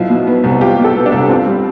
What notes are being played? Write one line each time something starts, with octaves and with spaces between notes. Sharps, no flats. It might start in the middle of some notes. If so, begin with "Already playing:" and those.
Already playing: B1 E4 F4
B2
B3
C2
F4 G4
B2
A4
B3
D4
C2
C4 F4
G3